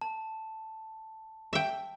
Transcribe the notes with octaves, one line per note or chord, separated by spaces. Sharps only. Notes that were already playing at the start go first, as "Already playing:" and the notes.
A5
E5 G5